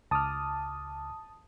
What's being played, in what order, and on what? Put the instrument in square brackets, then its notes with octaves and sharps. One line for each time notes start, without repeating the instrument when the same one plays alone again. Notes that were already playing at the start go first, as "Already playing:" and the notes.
[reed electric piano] C#2 D6 F6 [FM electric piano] A5 D#6